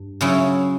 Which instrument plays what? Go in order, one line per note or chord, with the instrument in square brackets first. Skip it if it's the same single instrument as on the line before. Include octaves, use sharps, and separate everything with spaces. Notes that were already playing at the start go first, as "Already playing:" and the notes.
Already playing: [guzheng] G2
C#3 F#3 C#4 E4